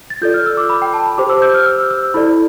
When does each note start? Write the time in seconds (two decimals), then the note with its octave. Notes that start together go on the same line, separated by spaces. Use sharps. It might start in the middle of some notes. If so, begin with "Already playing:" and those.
0.10 A6
0.22 F4 A4 D5 G6
0.34 F6
0.46 E6
0.57 D6
0.70 B5
0.82 G5
0.94 A5
1.06 B5
1.18 G4 C5 D6
1.30 E6
1.42 G6
1.54 F6
1.66 E6
1.91 E6
2.14 E4 A4 D5 B5